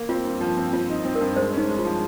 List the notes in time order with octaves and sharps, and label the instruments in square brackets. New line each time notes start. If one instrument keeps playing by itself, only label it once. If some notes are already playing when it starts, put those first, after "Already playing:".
Already playing: [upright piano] A#3
[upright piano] C4 [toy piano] F4
[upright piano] G2
F3
C4
[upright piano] C4 [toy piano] F4
[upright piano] D#4
C4
[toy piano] A#4
[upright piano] G2
[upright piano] G#3 [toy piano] C5
[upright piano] C#4 [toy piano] D#4
[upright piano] G#3
[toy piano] F4
[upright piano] F3